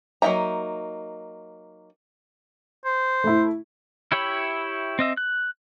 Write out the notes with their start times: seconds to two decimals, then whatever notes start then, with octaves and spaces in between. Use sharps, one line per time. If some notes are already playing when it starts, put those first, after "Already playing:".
0.22 F#3 A#3 D#4 E5 A#5
2.85 C5
3.24 A3 E4
4.12 E4 G4 C#5 E5 B5
4.99 C4 D#5 E5
5.17 F#6